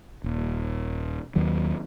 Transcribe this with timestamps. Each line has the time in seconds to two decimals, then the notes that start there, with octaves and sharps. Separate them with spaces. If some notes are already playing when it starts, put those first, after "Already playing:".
0.24 D#1
1.35 D#2 D#3 F#3